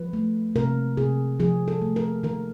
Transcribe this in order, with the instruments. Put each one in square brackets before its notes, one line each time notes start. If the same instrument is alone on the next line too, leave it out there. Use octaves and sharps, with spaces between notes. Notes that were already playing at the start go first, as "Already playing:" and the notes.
Already playing: [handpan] F3 B4
A3
C3 A#4
C3 G#4
F3 G#4
A4
A3
A#4
D#3 A#4